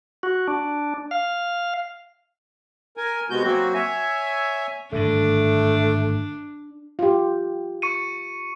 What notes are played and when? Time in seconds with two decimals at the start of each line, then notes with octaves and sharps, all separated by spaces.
0.23 F#4
0.48 D4
1.11 F5
2.97 A#4 G#5
3.30 C3 G#3 B3 F#4 G6
3.44 F#3 A#3 C4 F#4
3.74 C#5 E5 G#5
4.92 G#1 G2 D3 A3 D4
6.99 F4 G4
7.82 C#6 C#7 D#7